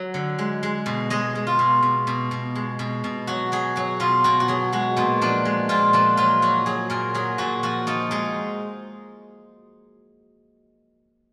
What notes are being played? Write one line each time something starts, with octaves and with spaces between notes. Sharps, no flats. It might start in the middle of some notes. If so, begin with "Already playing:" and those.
Already playing: F#3
D3
G#3
G#3
B2
G#3 D#5
G#3
F4
B2
B2
B2
B2
G#3
B2
B2
F#3 F#4
F#3 G#4
F#3 F#4
B2 F4
B2 F#4
F#4
F#3 G#4
G#3 F#4
A#2 B3
F3 D4
G#3
A#2 F4
F3 D4
F#3 F4
F#3 F#4
F#3 G#4
A#2 A#4
F#3 G#4
A#2 F#4
F3 F#4
F3 D#4
G#3 D#4